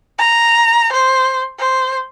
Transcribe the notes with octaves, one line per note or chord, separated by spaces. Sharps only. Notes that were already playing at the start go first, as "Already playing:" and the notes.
A#5
C5
C5